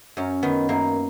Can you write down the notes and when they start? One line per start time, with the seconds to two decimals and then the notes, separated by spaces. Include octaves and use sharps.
0.17 F#2 C#4
0.43 D#3 B3
0.69 F#2 A#3